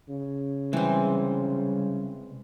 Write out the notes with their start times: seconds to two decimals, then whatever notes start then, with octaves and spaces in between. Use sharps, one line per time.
0.10 C#3
0.73 C3 E3 G3 G#3 C4